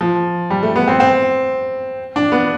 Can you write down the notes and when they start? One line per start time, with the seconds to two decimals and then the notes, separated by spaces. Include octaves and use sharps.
0.01 F3
0.50 G3
0.63 A3
0.76 B3
0.88 C4
1.00 C4
2.16 D4
2.32 B3